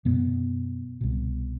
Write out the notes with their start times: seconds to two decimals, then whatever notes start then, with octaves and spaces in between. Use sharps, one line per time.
0.05 F#2 B2 B3
1.01 C2 B2